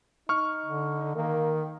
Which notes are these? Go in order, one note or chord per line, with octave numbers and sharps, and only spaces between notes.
D#4 C#6 F6
D3
D#3 A#3